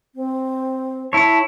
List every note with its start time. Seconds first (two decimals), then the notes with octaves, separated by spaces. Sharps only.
0.15 C4
1.13 E4 C#5 A5